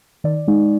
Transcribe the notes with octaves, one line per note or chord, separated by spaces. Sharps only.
D#3 D5
G#3 D#4